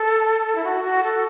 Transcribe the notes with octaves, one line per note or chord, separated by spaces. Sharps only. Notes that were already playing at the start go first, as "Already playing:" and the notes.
Already playing: A4
E4
F#4
F#4
A4